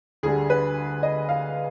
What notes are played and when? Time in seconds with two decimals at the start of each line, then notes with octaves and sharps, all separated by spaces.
0.23 D2 D3 G3 G#4
0.50 B4
1.03 D#5
1.29 F5